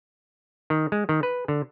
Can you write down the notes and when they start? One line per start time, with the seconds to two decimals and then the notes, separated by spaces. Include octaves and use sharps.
0.70 D#3
0.92 G#3
1.09 D#3
1.23 B4
1.48 D3